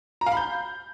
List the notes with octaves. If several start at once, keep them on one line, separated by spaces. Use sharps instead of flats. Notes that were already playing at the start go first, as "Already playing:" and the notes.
A#5
F5
B5
G6